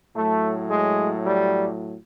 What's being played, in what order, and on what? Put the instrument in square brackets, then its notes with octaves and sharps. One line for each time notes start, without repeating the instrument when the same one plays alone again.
[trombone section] A2 F#3 A3
G#3
G3